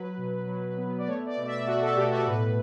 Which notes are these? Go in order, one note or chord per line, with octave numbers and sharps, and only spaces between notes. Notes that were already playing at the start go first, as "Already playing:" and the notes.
Already playing: F#3 B4
B2
F#3
B3
D5
A3 C#5
D5
B2
E5
A3 F#4
A4
B2 G4
F#4
A2 B4